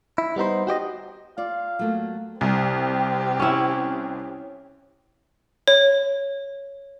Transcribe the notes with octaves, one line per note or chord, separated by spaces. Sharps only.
E4
G3 B3 D#4 C5
F#4 G4 D5 D#5
F4 D5 F5
F#3 A3 A#3
C2 C4 G4
C#4 E4
C#5